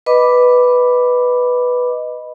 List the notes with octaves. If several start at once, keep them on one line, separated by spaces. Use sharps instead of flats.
B4 D#5 B5 D6